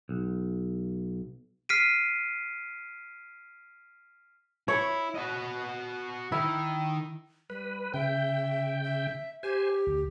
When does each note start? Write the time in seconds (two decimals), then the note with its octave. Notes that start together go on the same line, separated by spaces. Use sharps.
0.09 B1
1.69 F6 B6 C7 D7 D#7
4.68 E4 C#5
5.15 F#4 D#5
6.32 D#3 E4
7.50 G3 B4
7.94 C#3 E5 G5
8.84 E5
9.43 G4 C5 G#5
9.87 D2